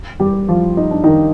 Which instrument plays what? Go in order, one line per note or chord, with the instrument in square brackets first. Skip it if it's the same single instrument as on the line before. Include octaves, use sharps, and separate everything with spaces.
[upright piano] G3 G4
F3 F4
D#4
D4
D#3 D#4